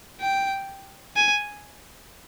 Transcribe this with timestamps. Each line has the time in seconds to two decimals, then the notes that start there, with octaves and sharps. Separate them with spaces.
0.21 G5
1.16 G#5